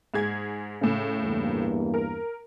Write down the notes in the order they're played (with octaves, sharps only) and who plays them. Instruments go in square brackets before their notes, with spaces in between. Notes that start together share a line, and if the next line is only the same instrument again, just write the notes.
[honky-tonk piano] G#2 G#4 G#6
A2 C#3
[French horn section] E2 G2 A#3
[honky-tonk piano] A#4